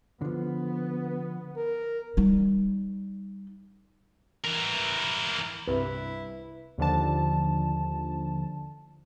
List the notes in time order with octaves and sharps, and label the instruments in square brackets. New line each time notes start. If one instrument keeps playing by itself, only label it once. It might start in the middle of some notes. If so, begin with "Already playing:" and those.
[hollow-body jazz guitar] D3 F3 [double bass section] B3
[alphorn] A#4
[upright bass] G3 D#4
[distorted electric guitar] E3 A#4
[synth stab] C2 G2 C3 [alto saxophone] E4 [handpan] B4
[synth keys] D#2 D3 F3 A5